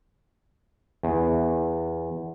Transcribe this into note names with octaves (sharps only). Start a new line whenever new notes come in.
E2